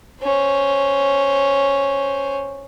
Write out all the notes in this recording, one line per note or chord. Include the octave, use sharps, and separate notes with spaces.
C#4 C5